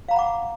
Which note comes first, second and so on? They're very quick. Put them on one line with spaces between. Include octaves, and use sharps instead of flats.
F5 A#5 B5 F#5 D6